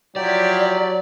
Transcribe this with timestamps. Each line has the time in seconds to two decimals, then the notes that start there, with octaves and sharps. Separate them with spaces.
0.16 F3 F#3 E4 G4 D5